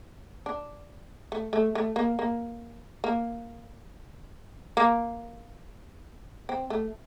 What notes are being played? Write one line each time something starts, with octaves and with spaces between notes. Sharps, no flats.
D4
A3
A3
A3
A#3
A#3
A#3
A#3
C4
A3